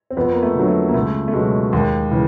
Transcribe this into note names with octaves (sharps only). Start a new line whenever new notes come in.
C4
F2 B3
A#3
A3
D3 F#3
A3
A#3
C#2 A3
A3
B2 F#3 G#3
D#2 G#3
C#3 E3